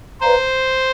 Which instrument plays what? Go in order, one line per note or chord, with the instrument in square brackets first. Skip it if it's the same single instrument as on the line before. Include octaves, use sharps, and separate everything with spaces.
[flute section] B4 D5 F5 A#5 [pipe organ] C5